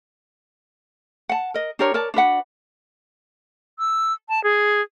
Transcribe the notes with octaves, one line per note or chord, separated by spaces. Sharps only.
F#5 A5
A#4 D#5
D4 G4 A#4 C#5
A#4 C#5 D5 A5
D4 F#4 B4 F#5
E6
A5
G#4